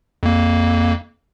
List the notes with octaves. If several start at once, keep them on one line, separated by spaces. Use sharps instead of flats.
F2 A#3